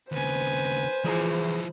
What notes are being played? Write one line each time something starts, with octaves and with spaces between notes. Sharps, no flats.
D#2 C#3 B4 C5 G#5
E3 F3 E4 G#4 A#5